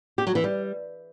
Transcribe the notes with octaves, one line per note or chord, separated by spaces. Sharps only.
G4
F#3
E3
G3